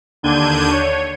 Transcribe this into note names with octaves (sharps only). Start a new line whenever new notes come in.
D#2 D3 D4 G6 G#6 D#7
C#5